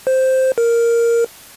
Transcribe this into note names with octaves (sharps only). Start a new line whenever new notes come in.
C5
A#4